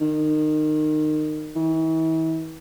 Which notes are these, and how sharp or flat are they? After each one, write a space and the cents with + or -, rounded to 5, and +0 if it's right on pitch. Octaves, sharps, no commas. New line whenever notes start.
D#3 -25
E3 -40